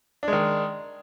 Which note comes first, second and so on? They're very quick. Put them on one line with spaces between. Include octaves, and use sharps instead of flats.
D4 G#3 D#3